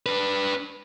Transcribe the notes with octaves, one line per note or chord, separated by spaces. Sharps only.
D4 B4